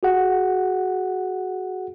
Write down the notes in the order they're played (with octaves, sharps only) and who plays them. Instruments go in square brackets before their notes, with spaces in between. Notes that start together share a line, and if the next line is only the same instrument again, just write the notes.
[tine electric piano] F#4 G#4 F#5